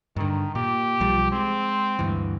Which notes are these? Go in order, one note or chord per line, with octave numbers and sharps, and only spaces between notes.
G2 D3 D#3
A#2 G4
B1 F3 G3
G#3 C4
D2 G2 E3